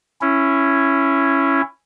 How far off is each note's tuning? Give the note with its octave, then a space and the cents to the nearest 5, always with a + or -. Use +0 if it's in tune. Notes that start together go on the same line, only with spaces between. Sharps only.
C#4 -5 E4 +15